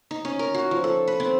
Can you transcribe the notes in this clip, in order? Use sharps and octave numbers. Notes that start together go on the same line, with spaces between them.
D#4
C#4
A#4
F#4
F3
A4
B4
C4